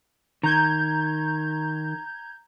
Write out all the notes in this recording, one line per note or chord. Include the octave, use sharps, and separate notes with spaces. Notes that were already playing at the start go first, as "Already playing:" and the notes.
D#3 A#5 G6 G#6